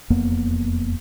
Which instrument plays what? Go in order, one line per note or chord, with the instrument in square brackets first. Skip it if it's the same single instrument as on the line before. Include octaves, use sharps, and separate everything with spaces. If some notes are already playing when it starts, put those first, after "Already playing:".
[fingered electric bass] E1 F2 A#3 B3